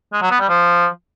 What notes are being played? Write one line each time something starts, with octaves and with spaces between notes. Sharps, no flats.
G#3
F#3
B3
G3
F3